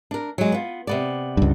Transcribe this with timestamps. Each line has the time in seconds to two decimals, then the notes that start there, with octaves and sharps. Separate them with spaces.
0.11 D4 A#4
0.38 F#3 G#3
0.52 B3 F4
0.87 C3 B3 D5
1.37 C#2 G2